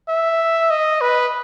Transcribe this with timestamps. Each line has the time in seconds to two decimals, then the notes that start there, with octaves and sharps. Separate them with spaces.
0.09 E5
0.70 D#5
1.01 B4